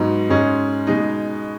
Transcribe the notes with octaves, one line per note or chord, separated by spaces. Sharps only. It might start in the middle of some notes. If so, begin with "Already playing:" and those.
Already playing: G#2 F#3 B3 D#4
G#2 G#3 C#4
B2 G#3 D#4